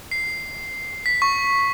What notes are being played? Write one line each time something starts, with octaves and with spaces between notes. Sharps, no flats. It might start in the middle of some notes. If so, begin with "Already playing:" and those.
C7
B6
C#6